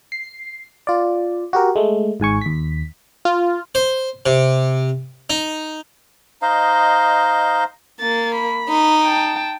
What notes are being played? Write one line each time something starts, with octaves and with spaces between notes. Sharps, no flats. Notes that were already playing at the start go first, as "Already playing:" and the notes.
C7
F4 D5
F#4 G4 A#4
G#3 A3
G#1 G#2 G#5 C#6
D#2 B6
F4
C5
C3
D#4
D#4 C5 D#5 F5
A#3 A6
B5
D#4
G5 A5